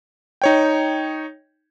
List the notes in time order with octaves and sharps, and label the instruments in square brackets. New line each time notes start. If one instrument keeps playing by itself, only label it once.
[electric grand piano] D#4 C#5 G5